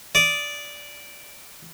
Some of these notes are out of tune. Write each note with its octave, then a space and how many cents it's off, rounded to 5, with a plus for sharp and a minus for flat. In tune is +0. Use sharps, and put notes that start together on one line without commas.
D5 -10 D#6 +0